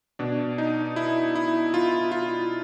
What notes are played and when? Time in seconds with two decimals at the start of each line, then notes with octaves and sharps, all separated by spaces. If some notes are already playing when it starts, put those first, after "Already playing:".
0.19 B2 D4
0.58 D#4
0.96 E4
1.35 E4
1.74 F4
2.12 F4